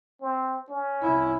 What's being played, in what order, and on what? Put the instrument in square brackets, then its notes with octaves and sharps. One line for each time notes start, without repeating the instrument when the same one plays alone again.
[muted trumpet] C4
C#4
[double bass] C2 E4